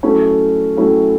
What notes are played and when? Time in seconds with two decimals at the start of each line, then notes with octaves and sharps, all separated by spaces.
0.03 A2 F#3 A3 C#4 E4
0.77 A2 F#3 A3 C#4 E4